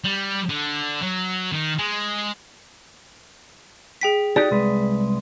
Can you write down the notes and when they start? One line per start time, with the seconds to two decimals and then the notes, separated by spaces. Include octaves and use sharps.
0.04 G3
0.49 D3
1.03 F#3
1.52 D#3
1.79 G#3
4.01 G#4 G5 B6
4.36 D#4 F#4 G4 D5
4.51 C2 G#3 B4